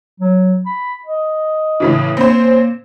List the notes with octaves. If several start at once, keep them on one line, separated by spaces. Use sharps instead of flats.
F#3
B5
D#5
A2 C#3 E3
A#3 C4 C#4 C5